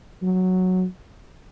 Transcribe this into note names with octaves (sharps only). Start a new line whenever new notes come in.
F#3